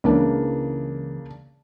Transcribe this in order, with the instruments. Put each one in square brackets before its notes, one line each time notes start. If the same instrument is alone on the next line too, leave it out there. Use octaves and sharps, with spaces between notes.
[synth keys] C#2 E3 [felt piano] C#3 A#3 D4